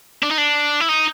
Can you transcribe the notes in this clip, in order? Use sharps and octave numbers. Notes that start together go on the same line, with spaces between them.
D4
D#4
D4
E4
D#4